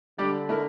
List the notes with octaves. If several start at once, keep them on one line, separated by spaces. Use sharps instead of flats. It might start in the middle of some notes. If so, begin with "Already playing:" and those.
D3 G3 D4 G4 D5
A3 E4 A#4